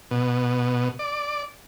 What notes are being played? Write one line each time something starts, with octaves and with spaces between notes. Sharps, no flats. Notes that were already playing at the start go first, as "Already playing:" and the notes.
B2
D5